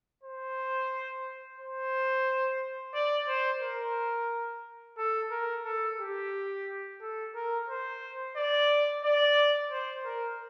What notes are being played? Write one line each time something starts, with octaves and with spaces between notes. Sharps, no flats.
C5
C5
D5
C5
A#4
A4
A#4
A4
G4
A4
A#4
C5
D5
D5
C5
A#4